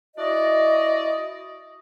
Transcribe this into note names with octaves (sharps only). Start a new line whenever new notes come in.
E4 F#4 D5 D#5